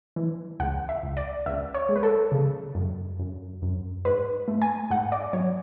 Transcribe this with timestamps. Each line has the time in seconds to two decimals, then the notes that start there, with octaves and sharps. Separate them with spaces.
0.16 E3
0.60 C#2 F#5
0.89 E5
1.03 C#2
1.17 D5
1.46 C#2 E5
1.74 C#5
1.89 G#3
1.96 B4
2.03 A4
2.32 C#3
2.75 F#2
3.19 F#2
3.62 F#2
4.05 G#2 B4
4.48 A3
4.62 G#5
4.90 G#2 F#5
5.12 D5
5.33 F#3 C#5